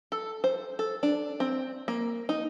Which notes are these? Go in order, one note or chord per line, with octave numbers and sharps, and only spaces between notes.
A4
C5
A4
D4
C4
A#3
D#4